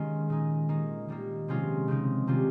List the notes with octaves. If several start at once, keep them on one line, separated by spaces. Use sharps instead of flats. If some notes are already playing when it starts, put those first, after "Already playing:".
Already playing: D#3 G#3 A#3 C#4 F4
A#2 G#3 D#4
D#3 A#3 D#4
D#3 G3 A#3
C3 F3 G#3 C#4 F4
C#3 F3 C4 D#4
C3 D#3 G3 C#4 F4